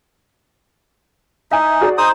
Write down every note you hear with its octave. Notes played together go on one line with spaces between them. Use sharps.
D#4 E5 G#5
F#4 G#4 D5
D#4 C5 D#6